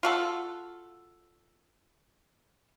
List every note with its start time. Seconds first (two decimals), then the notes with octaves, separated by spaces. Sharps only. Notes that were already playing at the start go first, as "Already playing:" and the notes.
0.03 F4 F#4 A4